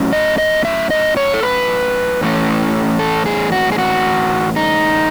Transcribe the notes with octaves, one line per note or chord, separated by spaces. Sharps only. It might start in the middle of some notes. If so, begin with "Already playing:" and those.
Already playing: A2 F#3 C#4
D#5
D#5
E5
D#5
C#5
A4
B4
A2 E3 A3 C#4
A4
G#4
F#4
G#4
F#4
D#4